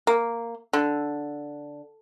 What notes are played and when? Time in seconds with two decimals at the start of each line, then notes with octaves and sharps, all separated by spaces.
0.07 A#3
0.73 D3